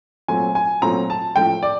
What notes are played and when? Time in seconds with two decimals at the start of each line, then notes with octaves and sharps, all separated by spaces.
0.28 A#2 F#3 A3 C4 G#5
0.55 G#5
0.82 A#2 F#3 A3 C4 A#5
1.10 A5
1.36 A2 F3 A3 G5
1.63 D5